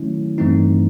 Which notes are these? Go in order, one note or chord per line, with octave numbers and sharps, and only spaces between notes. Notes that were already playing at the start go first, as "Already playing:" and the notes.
Already playing: D#3 F#3 A3 C#4 E4
G2 E3 A3 C4 D#4